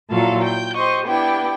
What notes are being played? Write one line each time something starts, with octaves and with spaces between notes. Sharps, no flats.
A#2 F#3 E4 F4 A4 F5
G5 G6
G4 C5 D#5 C#6
B3 D4 E4 G4 G5